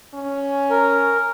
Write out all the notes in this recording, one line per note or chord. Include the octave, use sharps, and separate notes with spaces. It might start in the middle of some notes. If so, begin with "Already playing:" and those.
C#4
A#4